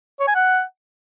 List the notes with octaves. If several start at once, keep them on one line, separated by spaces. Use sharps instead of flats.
C#5
G#5
F#5